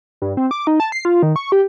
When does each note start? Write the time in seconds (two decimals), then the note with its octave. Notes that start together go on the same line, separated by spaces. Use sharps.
0.22 G2
0.37 C4
0.51 D6
0.67 D#4
0.80 A5
0.92 C7
1.05 F4
1.23 D#3
1.36 C#6
1.52 G4